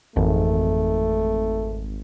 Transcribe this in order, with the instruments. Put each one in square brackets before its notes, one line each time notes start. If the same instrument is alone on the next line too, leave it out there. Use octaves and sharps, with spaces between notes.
[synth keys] G#1 [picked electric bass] F2 E3 [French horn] A3